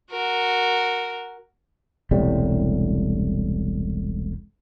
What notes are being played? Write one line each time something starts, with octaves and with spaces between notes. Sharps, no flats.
F#4 A#4
E1 C2 A2 G3